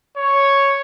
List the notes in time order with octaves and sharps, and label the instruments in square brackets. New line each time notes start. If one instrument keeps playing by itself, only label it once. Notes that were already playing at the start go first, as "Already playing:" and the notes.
[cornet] C#5